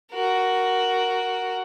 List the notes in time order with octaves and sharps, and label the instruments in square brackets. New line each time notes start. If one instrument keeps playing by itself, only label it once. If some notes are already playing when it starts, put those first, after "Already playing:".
[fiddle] F#4 A#4